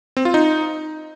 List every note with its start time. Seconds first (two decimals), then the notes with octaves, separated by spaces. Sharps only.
0.17 C4
0.25 F4
0.34 D#4